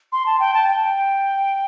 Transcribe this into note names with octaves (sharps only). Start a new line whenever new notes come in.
C6
A5
G5
A5
G5